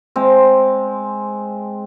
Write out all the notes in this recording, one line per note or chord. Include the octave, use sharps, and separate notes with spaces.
G#3 C4